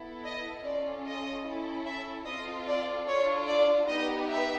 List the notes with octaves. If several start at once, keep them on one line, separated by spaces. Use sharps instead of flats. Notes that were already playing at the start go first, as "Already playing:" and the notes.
Already playing: B3 E4 A4
D#5
C#4 F4 A4 D5
D#5
C#4 E4 A4
E5
C4 F4 A4 D#5
D5
D4 F4 A4 C#5
D5
B3 D#4 G4 D#5
E5